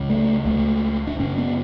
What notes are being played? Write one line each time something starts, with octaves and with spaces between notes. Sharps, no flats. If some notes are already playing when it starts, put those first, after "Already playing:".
Already playing: C#2 C#3
A3
C#2 C#3 A3
D4
F#2 C#3 C#4
B3